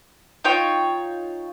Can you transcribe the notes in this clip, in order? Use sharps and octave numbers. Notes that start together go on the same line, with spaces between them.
D#4 F4 C#5 G5